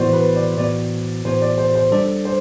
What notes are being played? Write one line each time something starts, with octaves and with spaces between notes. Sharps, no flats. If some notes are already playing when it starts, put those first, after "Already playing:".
Already playing: A2 E3 B3 F#4 C5 D5
B4
D5
A2 E3 B3 F#4 D5
A2 E3 B3 F#4 C5
D5
C5
C5
G3 D4 A4 D5
C5